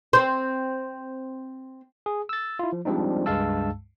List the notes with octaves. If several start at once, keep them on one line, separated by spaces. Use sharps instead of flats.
C4 C5
G#4
E6 A6
E4 F4
F3
F3 G3 G#3 C4 D4 D#4
C#2 G2 G#3 F5 A5 E6